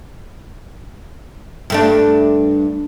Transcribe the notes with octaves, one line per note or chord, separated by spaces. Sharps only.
G2 A3 D4